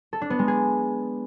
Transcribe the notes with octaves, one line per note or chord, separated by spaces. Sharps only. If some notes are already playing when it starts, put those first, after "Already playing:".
A4
D4
B3
G#3
G#4